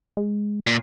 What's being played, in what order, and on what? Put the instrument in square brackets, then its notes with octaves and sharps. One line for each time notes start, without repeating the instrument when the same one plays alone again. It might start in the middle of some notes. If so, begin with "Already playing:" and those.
[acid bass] G#3
[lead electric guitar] A#2